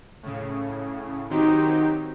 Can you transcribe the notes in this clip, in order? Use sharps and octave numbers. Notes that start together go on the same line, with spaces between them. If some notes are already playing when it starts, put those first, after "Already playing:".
A2 C#3
D#3 F#3 C4 D#4 G4